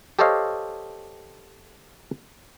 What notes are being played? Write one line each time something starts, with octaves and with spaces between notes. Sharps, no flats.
G4 A4 C5 C#5 D#5 F5